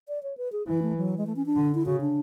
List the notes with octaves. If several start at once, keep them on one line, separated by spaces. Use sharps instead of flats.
D5
C#5
B4
G#4
E3 E4
A3
F#3
G#3
A3
C#4
D4
D3
E4
C#3 F#4
D4